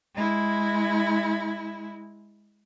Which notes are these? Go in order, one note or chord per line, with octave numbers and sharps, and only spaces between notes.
G#3 E4